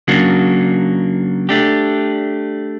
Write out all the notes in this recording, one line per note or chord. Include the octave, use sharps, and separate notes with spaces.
C#3 F#3 A#3 D4
A3 D4 G4